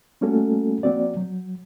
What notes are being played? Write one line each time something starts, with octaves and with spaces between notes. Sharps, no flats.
G3 A3 A#3 C#4 F#4 A4
F3 A#3 C4 F#4 D5
F#3